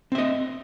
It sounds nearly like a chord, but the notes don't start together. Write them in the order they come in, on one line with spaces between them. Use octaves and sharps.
C4 E5 D#5